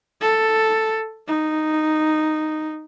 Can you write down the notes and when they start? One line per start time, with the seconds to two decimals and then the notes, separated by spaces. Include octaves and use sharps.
0.21 A4
1.27 D#4